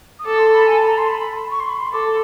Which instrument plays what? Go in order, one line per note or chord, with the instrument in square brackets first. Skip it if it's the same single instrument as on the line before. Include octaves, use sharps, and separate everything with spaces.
[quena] D#6
[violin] A4 [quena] D6
[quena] C6
B5
G#5
A5
A#5
C6
B5
C#6
C6
B5
C6
[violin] A4 [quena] D6